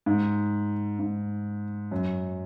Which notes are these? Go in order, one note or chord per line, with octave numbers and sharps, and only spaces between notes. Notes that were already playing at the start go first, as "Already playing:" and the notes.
G#2
G#2
F#2